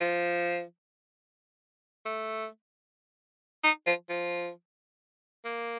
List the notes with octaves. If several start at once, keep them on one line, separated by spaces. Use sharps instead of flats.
F3
A3
D#4
F3
F3
A#3